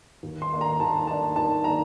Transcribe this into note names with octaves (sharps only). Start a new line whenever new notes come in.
D#2
C6
D#3 A#3 D4
A#5
D#2 A5
D#3 A#3 D4 A5
D#2 A5
D#3 A#3 D4 A#5